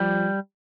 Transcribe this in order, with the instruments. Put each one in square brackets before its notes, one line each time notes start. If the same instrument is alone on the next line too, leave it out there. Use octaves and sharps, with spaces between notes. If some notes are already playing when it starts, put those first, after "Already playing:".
Already playing: [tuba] F3 [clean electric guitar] G3